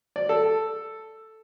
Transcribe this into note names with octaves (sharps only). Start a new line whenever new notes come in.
D5
A4